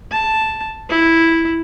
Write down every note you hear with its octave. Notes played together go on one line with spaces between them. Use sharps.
A5
E4